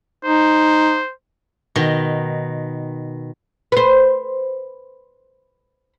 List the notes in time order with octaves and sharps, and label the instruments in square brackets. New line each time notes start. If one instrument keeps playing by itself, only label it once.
[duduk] D#4 [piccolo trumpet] C5
[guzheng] B2 D#3
[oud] B4 C5